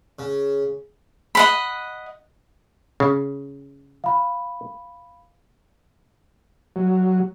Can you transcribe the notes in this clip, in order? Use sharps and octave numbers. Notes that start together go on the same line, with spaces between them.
C#3
D#5 F#5 B5
C#3
F5 B5
F#3